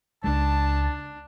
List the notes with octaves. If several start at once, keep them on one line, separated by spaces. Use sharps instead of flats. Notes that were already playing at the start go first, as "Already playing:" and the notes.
C#2 G#3 D4 A5